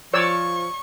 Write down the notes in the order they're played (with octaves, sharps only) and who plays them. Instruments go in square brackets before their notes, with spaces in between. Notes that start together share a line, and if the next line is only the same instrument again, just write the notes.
[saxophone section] F3 [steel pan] C#5 D5 E6 [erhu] C#6